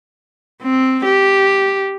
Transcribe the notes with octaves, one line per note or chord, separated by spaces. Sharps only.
C4
G4